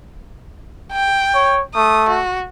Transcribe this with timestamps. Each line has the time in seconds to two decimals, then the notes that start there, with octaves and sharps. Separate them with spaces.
0.92 G5
1.34 C#5
1.75 A3 D#6
2.09 F#4